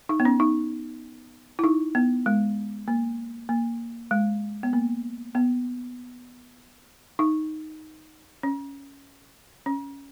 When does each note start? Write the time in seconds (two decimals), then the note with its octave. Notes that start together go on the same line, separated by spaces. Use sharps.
0.09 D#4
0.20 B3
0.25 C#4
0.40 D#4
1.59 E4
1.64 D#4
1.95 B3
2.26 G#3
2.88 A#3
3.49 A#3
4.11 G#3
4.63 B3
4.73 A#3
5.35 B3
7.19 D#4
8.43 C#4
9.66 C#4